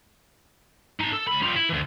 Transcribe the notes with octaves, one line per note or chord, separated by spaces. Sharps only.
D#4 A5
A4
C#2 B5
G3 F4
E4
D2 E3